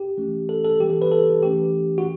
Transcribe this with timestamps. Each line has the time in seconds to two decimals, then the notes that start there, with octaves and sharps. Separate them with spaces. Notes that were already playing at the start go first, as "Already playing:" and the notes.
Already playing: G4
0.17 E3 A3 C#4
0.49 A4
0.64 A4
0.80 E3 G3 B3 G4
0.90 A4
1.02 B4
1.12 A4
1.43 E3 A3 C#4 G4
1.98 F#4